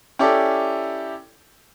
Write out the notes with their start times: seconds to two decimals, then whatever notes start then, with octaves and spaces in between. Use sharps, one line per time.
0.19 C#4 E4 G4 A4 D5